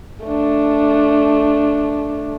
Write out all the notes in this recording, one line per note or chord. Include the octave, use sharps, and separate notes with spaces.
A3 D4